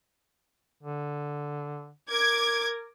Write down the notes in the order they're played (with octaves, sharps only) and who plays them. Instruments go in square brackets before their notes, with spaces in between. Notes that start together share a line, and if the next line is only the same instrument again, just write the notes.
[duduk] D3
[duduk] A#4 [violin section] D6 G#6